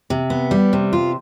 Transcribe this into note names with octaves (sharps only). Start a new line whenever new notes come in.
C3
B3
G3
C3
F4